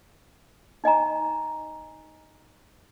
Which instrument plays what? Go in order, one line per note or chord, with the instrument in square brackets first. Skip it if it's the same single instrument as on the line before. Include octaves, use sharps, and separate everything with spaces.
[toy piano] D#4 D#5 G#5 A#5